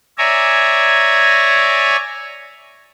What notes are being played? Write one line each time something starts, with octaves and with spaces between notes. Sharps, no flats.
C#5 D5 E5 G#5 A#5